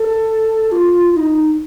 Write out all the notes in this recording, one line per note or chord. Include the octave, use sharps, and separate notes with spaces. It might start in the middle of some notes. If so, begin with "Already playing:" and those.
Already playing: A4
F4
F4
D#4